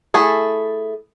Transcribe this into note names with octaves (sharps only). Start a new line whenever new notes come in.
A3 E4 G#4 A4